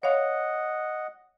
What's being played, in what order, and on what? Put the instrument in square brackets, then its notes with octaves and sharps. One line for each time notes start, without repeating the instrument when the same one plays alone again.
[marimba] C#5 F5 [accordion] D#5 F#5